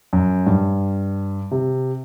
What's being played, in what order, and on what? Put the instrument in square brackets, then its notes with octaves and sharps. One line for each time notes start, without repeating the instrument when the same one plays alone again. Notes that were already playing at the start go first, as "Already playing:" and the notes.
[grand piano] F#2
G2
C3